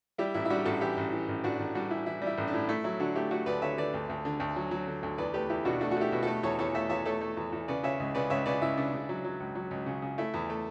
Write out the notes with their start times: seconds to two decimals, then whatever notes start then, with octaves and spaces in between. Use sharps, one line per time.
0.18 G3 E4 G4
0.34 A1 E4
0.45 E4
0.50 G3 D4 F#4
0.65 A1 F#4 A4
0.81 E3 E4 G4
0.97 A1
1.12 E3
1.29 A1
1.44 A1 D4 F#4
1.60 A1
1.75 G3 D4 F#4
1.90 E3 E4
2.06 E3 E4
2.22 G3
2.27 E4
2.38 A1
2.48 D4
2.53 A2
2.69 A3 E4
2.84 F#3 E4
3.00 D3 D4 F#4
3.15 A3 E4 G4
3.31 A3 F#4 A4
3.46 D2 B4 D5
3.62 D3 C#5 E5
3.78 D3 B4 D5
3.94 D2
4.10 D2
4.25 D3
4.40 D2
4.56 F#3
4.71 F#3
4.87 D3
5.03 D2
5.18 E2 B4 D5
5.34 A3 G4 B4
5.50 E2 E4 G4
5.65 B2 D4 F#4
5.81 A3 D4 F#4
5.91 F#4
5.97 A3 E4 G4
6.12 B2
6.22 A3 F#4 A4
6.43 E2 A4 C#5
6.59 E2 A4 C#5
6.74 A3 C#5 E5
6.89 E2 C#5 E5
7.05 A3 A4 C#5
7.21 A3
7.37 E2
7.53 E2
7.68 C#3 B4 D5
7.83 C#3 C#5 E5
8.00 C#2
8.15 C#3 B4 D5
8.30 C#2 C#5 E5
8.46 C#3 B4 D5
8.62 C#2 E4
8.78 C#3 D4
8.93 C#3
9.09 F#3
9.24 F#3
9.40 C#2
9.55 F#3
9.71 C#2
9.86 C#3
10.02 C#3
10.18 A3 E4
10.34 E2
10.50 A3